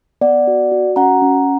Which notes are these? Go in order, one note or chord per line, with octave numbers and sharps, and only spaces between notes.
B3 D5 F#5
F#4
F#4
C#4 F#5 A#5
C#4